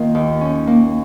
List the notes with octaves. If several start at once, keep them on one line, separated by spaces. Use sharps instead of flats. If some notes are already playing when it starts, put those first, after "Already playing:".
Already playing: D#3 A#3 F4
D#2
C#4
A#3